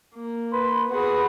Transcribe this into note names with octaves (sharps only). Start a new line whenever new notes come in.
A#3
B4 C6
B3 F#4 G#4 B4